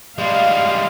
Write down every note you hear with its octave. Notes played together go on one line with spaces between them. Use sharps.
G3 G#3 F5